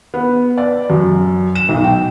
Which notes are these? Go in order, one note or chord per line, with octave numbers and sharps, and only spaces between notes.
B3
D5
F#2
E7
B1
G5